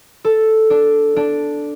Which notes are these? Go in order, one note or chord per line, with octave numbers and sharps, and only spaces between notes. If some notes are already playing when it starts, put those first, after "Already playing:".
A4
D4
D4